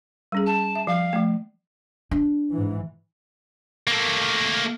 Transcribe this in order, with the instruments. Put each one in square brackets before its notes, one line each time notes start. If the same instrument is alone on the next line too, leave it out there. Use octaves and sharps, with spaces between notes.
[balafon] G3 C#4 G#4
[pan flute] A5
[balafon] E5
[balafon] F3 [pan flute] F5
[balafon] F3 A3
[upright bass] D4
[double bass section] G#2 E3
[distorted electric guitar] A3 A#3